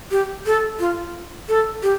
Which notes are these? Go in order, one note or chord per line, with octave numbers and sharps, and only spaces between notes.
G4
A4
F4
A4
G4